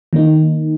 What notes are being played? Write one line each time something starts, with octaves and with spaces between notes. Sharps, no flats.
D#3 A#3 D#4